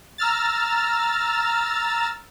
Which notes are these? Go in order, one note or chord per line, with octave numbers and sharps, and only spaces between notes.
A#5 E6 F6 A6